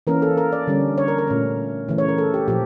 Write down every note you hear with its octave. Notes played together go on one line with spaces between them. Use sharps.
E3 A#3 C#4 A#4
A4
A#4
D5
D3 G3 C#4
C#5
A#4
A#4
A#2 A3 C#4
C#3 E3 A3
C#5
A#4
A4
G4
A#2 F3 G4